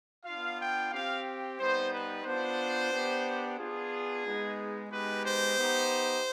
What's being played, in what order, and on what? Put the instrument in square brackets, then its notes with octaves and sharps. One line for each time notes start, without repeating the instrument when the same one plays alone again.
[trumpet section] B3 D4 F4 F5
G5
C4 G4 F5
G3 B3 D#4 C5
B4
B3 D4 F4 C5
B3 D4 G4
B3 D4 F4 G#4
G#3 B3 D#4
G#3 B3 D#4 G4 B4
C5
B3 D#4 G4